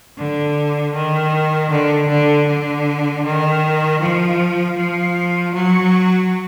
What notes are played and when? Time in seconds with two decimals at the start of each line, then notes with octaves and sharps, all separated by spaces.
0.18 D3
0.94 D#3
1.71 D3
2.09 D3
2.47 D3
3.25 D#3
4.01 F3
4.77 F3
5.54 F#3